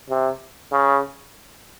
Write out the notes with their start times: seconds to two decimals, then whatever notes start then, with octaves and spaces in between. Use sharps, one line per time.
0.10 C3
0.72 C#3